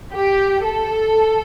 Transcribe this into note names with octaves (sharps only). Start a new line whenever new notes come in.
G4
A4